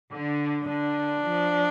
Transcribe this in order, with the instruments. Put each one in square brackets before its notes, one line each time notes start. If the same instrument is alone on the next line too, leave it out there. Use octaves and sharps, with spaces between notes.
[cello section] D3
[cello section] D3 [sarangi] D4
[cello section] F3